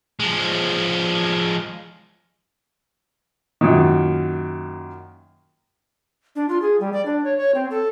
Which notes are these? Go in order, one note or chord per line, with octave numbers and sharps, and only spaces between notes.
F3 G#3
F#2 A#2 D#3
D4
F4
G#4
G3
D5
D4
C#5
C#5
C4
A4